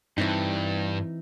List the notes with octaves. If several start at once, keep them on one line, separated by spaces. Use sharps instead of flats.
G2 E3 C4 D#4